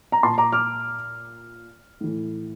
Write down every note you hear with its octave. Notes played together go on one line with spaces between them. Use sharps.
A#5
A#2 A5 C6
A#5 D6
D6 F6
A2 E3